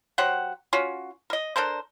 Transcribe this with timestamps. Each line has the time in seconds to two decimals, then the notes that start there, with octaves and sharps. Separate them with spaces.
0.18 F#3 G4 C5 F#5
0.73 C#4 F4 F#4
1.30 A#4 D#5
1.56 D4 A4 A#4 C5